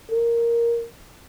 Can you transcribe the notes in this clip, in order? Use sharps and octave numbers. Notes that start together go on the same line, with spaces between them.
A#4